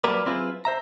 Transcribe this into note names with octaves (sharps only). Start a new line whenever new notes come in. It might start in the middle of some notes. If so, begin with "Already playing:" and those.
F#3 G3 A#3 A#4 B4 D5
F#3 C4 E4 F4 G#4 B4
C5 E5 A#5